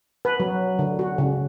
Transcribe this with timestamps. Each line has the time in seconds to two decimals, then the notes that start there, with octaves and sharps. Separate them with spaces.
0.25 B4
0.40 F#3
0.79 D3
0.99 F#4
1.18 C#3